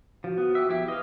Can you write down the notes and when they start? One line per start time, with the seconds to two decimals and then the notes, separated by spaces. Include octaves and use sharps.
0.24 F3 F#4
0.38 B3
0.55 G4 E5
0.69 F3 E4 G4 E5
0.88 B4 D#5 F5